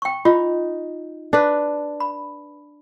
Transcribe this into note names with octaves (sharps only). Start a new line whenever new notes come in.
G5 C#6
D#4 F4
D4 B4
B5